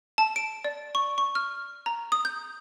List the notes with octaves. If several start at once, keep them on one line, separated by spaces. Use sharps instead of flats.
A5
D7
D5
C#6
C#6
F6
A#5
D#6
G6